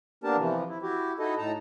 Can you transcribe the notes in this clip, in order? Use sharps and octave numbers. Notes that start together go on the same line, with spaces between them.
A#3 B3 D4 G4 A#4 A5
C3 E3 F3
E4
E4 F#4 G4
D#4 E4 F#4 A4 D#5
A2 D#4 A5 A#5